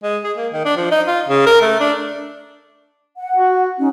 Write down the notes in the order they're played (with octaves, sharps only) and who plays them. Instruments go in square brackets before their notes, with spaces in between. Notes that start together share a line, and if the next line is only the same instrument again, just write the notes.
[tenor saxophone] G#3
G#4
A#3
D#3
D4
F3
D#4
F4
C#3
A#4
A3
D4
[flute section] F#5
[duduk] F#4
[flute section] C#4 D#4